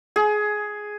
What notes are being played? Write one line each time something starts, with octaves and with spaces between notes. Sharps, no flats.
G#4